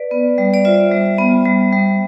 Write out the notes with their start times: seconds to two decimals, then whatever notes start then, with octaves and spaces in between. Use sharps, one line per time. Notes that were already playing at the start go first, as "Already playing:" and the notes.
Already playing: B4 D5
0.11 B3
0.38 G3
0.54 D5
0.65 F4 C5 E5
0.91 G3
1.18 B3
1.45 G3
1.73 G3